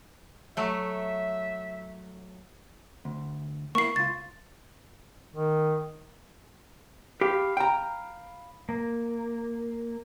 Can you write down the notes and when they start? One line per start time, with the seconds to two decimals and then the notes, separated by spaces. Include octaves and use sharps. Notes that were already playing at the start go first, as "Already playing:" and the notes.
0.57 F#3 A3 E5
3.05 D2
3.75 A#3 B3 E4 C#6 C7
3.96 C#2 F4 A6
5.34 D#3
7.21 G4 F5 B5
7.57 G5 A#5
8.69 A#3